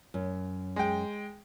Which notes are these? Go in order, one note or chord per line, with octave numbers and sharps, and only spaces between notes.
F#2
G#3 G5